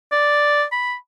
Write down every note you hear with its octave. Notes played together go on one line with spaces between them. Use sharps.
D5
B5